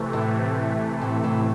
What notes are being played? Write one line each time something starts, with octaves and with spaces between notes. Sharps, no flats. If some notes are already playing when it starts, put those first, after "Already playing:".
Already playing: C3 E3 A3
A2
A2
A2